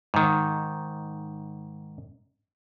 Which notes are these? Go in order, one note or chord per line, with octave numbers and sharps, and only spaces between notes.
G#2 D#3